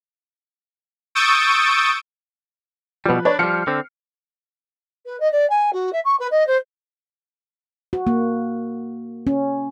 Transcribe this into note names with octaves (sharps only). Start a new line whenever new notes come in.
C#6 D#6 E6 G6 A6 D7
B2 F3 G3 B4
D4 B4 C#5 D5
F3 G3 F6 C7 C#7
D3 C4
B4
D#5
D5
G#5
F#4
E5
C#6
B4
D#5
C5
F#4
A#3
C#4